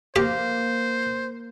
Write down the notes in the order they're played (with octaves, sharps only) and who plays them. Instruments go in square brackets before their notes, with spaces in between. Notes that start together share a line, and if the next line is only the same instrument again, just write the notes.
[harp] A#3 [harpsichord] G4 [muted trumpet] C5